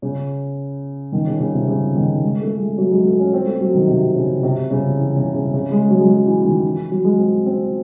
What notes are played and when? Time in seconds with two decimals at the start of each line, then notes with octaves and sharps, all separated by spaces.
0.02 C#3
1.12 D#3
1.27 C#3
1.40 C#3
1.54 C3
1.68 C#3
1.95 D#3
2.23 G#3
2.41 A3
2.59 G#3
2.78 F#3
2.91 G#3
3.05 A3
3.19 C#4
3.34 C4
3.47 A3
3.61 F#3
3.74 D#3
3.88 C3
4.16 C#3
4.43 C3
4.71 C#3
4.98 E3
5.17 C#3
5.35 C#3
5.54 C#3
5.71 G#3
5.90 F#3
6.00 G#3
6.08 F#3
6.26 E3
6.45 D#3
6.63 E3
6.91 F#3
7.04 G#3
7.19 C4
7.46 C4